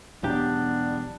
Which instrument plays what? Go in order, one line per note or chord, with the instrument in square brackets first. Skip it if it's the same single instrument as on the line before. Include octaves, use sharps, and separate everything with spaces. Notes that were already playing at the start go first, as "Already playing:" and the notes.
[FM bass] E1 [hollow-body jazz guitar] B1 E2 G4 [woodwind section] G3 B3 D4